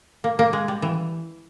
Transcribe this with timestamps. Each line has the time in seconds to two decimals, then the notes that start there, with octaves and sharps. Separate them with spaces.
0.24 A#3
0.39 A#3
0.53 G#3
0.68 G3
0.82 E3